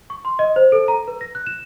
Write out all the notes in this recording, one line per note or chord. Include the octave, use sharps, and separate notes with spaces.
C#6
C6
D#5
C5
A4
A#5
B4
A#6
F#6
E7